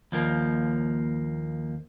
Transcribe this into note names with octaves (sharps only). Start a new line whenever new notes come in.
D#2 F3 A#3